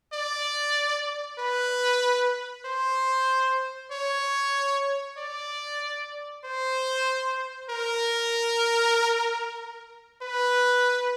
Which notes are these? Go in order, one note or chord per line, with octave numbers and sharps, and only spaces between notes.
D5
B4
C5
C#5
D5
C5
A#4
B4